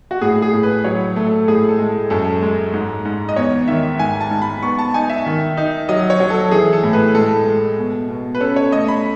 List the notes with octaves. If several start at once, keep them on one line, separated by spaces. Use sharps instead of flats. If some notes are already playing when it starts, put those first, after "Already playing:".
F#4
A2 G#4
G#4
A2
B4
F#3 C#5
A3
A4
A2 G#4
A4
G#3
F#2 A4
G#3
G#2
G#2
D#5
E2 C#5
D#3 E5
G#2 G#5
A5
G#2
B5
B3 C#6
A5
D#4 G#5
E5
D#3
D#4
F#3 D#5
C#5
F#3
A4
E3 G#4
A4
A2
B4
G#3 A4
G#3
B2
B2
B4
C#4 A4
C#5
A3 D#5
B5